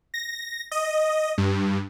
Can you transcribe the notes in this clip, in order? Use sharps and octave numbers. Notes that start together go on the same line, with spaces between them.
A#6
D#5
G2